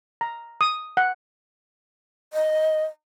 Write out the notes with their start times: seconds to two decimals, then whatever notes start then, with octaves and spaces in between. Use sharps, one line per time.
0.21 A#5
0.61 D#6
0.97 F#5
2.33 D#5